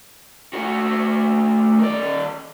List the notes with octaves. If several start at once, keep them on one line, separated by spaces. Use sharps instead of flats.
A3 F#4
D#3 D5